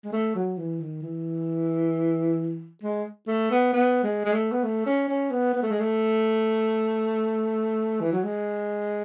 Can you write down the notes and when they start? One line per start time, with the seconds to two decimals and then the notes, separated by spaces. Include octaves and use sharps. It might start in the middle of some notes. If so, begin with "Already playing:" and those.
0.04 G#3
0.12 A3
0.35 F#3
0.58 E3
0.80 D#3
1.02 E3
2.83 G#3
3.27 A3
3.51 B3
3.73 B3
4.03 G#3
4.25 G#3
4.33 A3
4.52 B3
4.63 A3
4.86 C#4
5.08 C#4
5.30 B3
5.53 B3
5.62 A3
5.70 G#3
5.80 A3
8.00 E3
8.12 F#3
8.24 G#3